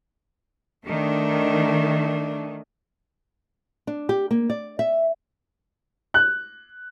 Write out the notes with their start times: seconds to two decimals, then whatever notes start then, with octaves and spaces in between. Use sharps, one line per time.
0.87 D#3 A3 D4
3.87 D4
4.09 G4
4.31 A#3
4.50 D5
4.79 E5
6.14 F#6